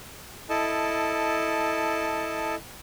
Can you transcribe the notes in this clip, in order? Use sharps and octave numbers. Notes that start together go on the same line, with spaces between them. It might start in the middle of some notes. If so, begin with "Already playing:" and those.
E4 A4 D#5 A5